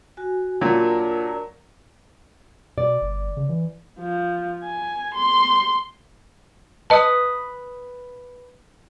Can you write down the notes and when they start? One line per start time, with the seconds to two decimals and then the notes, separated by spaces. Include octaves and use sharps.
0.17 F#4 G#5
0.61 A#2 F#3 D4 A#4
2.78 B2 D5
3.02 G1
3.37 C#3
3.49 E3
4.00 F3
4.64 G#5
5.15 C6
6.90 B4 D#5 A5 D#6